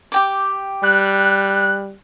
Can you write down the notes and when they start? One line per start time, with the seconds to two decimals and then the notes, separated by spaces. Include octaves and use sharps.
0.12 G4 G5 D6
0.84 G3 F#6